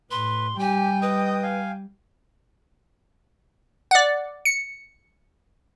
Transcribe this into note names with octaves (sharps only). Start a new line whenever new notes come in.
A2 B4 C6
G3 G4 G5 G#5
B4 D#5 D#6
F5 G#5
D5 F#5
C#7